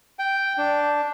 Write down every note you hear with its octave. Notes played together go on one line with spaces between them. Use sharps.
G5
D4